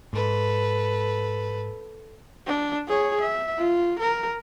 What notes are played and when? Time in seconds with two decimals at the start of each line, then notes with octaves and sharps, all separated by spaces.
0.13 G#2 A4 B4
2.47 D4
2.88 G#4 C#5
3.21 E5
3.59 F4
3.99 A#4